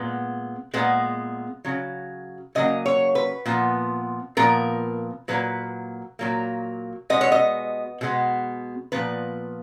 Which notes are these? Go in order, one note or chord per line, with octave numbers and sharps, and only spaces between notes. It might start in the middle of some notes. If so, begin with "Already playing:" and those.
Already playing: A#2 G#3 B3
A#2 G#3 B3
C#3 F#3
C#3 F#3 A#3 D#5
C#5
B4
A#2 F3 B3
A#2 F3 B3 A#4
A#2 F#3 A#3 B4
A#2 F#3 A#3
B2 G#3 B3 D#5
C#5
D#5
B2 G#3 B3
A#2 F3 B3 B4